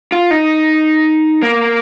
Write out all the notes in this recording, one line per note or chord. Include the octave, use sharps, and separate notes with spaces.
F4
D#4
A#3